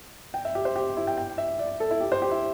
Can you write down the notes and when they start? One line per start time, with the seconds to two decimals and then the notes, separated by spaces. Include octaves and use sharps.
0.34 G5
0.45 E5
0.55 G4
0.65 C5
0.76 G4
0.97 E4
1.07 G5
1.17 G5
1.38 E5
1.59 D5
1.80 A4
1.91 E4
2.01 G4
2.12 C5
2.22 G4
2.31 E4